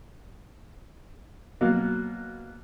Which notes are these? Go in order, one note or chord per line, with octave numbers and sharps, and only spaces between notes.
B2 F#3 A#3